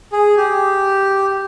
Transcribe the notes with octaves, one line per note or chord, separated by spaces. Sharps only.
G#4
G4